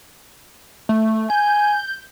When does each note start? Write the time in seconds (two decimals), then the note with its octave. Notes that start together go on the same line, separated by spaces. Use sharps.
0.89 A3
1.30 G#5 G6